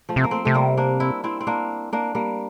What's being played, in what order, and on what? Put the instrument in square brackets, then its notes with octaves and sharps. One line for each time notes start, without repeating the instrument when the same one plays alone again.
[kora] F3 A3
[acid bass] C3
[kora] A#3
A3 C4
[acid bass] C3 [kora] A3
[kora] G3 A#3
A#3 D4
C4 E4
C4 E4
C4
A#3 D4
A#3 D4
G3 A#3